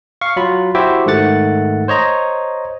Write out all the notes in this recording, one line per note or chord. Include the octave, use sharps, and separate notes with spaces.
F5 C#6
F#3 F4 B5
E4 F#4 G4 C5 E5 D6
G#2 D#3 A3 F#5 A6
C5 C#5 D#5 A#5